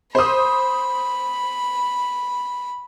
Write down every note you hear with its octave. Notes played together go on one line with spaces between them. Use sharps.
C5 B5 D#6